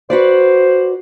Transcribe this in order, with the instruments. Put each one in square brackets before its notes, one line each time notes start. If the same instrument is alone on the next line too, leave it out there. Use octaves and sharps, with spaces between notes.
[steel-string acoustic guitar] F#4 B4 D5 [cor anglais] C5